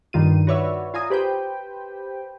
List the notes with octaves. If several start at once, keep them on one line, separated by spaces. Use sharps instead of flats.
G2 D#3 F4 D#7
F#4 B4 C#5 D5 E5
F4 G#5 A#5 D#6
G4 B4 C5 G5